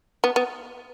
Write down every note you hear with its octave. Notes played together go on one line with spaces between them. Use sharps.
B3
B3